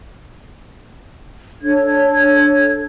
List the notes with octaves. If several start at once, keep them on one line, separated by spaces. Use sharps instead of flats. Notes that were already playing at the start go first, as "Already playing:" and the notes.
D4 A4 C#5 G#6